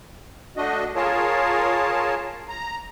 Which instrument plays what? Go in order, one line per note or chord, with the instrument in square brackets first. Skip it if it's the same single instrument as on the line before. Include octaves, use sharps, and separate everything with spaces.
[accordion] A3 D4 F#4 D#5
F4 G#4 A#4 C#5 A5
A#5